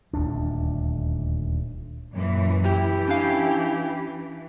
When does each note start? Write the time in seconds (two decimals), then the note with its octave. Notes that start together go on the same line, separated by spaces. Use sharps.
0.13 D#1 D2 D4
2.13 F#2 A#2 E3
2.64 E3 E4 G4
3.08 C#4 D4 F5